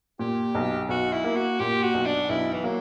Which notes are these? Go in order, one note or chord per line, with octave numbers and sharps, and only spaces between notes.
A#2 G4
B1
B1 F#4
E4
A#3
F#4
A#2 G4
F#4
B1
D4
B1 E4
E3
F#3 A#3